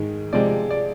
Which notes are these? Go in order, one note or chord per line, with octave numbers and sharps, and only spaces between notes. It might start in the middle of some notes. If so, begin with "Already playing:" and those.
Already playing: G#2 D#3 G#3
C3 F3 G#3 D5
D5